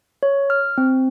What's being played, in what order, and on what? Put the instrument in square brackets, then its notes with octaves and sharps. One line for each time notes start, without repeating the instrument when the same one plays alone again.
[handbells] C#5
F6
C4